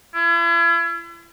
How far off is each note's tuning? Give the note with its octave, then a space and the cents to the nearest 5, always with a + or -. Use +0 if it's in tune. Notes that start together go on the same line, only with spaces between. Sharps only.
E4 +40